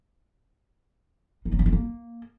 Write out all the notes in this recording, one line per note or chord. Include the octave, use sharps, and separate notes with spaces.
D#4
F#3
A#3
C4
A#3